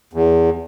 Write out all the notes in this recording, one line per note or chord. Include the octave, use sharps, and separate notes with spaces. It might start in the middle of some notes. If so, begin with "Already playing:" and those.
E2